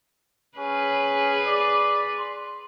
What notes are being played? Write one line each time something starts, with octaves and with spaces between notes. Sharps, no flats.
C#4 G#4 B4
D5
C6